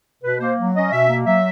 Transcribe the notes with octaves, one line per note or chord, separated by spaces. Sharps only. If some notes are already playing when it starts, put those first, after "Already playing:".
B2 B4
A#3 C5
F#3
C#4 D#5
B2 E5
A#3
F#3 E5